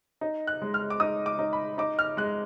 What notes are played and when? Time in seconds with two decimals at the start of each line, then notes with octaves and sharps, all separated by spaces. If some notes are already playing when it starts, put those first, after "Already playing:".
0.21 D#4
0.47 F#6
0.62 G#3
0.74 F6
0.90 D6
1.00 D#4 D#6
1.26 D6
1.39 D#4
1.53 B5
1.78 D#4 D6
1.99 F6
2.17 G#3 F#6